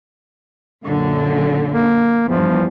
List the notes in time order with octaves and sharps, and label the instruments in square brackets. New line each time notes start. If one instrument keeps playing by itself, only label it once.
[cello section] F#2 A#2 D3
[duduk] A#3
[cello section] E2 G2 [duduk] F3